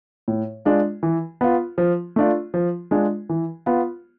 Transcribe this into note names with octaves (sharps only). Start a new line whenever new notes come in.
A2
G#3 D4 F4
E3
B3 F4
F3
A3 D4 F4
F3
G#3 D4 F4
E3
B3 F4